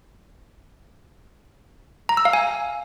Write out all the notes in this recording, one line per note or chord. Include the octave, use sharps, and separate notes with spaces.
A#5
E6
F5
G#5